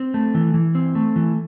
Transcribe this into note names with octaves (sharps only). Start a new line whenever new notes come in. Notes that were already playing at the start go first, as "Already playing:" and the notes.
Already playing: C4
A3
E3
E3
C4
A3
E3